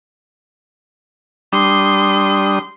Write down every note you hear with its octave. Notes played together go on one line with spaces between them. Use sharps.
G3 D4 C6 D#6